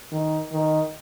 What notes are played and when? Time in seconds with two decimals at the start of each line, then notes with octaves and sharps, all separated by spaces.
0.12 D#3
0.52 D#3